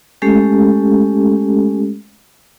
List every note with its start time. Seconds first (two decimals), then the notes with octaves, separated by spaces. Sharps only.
0.22 G#3 A3 C#4 G4 A4